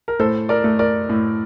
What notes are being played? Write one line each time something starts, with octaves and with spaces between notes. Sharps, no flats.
A#4
A2 A4 C5
A#4 D5
A3
A#4 D5
A2